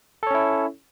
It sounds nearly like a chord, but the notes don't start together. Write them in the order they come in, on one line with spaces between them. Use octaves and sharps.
A4 C#5 C#4 E4